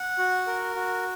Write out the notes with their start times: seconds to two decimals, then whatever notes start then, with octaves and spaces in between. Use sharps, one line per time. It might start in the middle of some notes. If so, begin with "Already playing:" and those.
Already playing: F#5
0.18 F#4
0.47 A#4
0.75 F#4